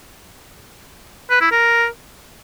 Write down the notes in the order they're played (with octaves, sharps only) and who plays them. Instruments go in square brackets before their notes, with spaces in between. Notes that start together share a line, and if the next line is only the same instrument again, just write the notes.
[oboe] B4
E4
A#4